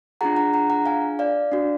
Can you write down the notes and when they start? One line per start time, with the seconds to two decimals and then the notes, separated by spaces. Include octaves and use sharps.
0.21 D4 F4 G#4 F#5 A#5
0.36 F#5 A#5
0.54 F#5 A#5
0.70 F#5 A#5
0.86 F5 G#5
1.19 D5 F5
1.52 D4 F#4